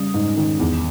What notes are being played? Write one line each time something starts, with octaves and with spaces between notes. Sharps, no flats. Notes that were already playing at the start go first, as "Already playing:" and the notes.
Already playing: C#3 G3 C#4 D#6
G#2
D#3
E2